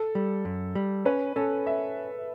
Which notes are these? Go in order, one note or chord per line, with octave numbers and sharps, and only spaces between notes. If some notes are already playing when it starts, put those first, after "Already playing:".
Already playing: A4
G3
F#2
G3
C#4 B4
C#4 A4
E5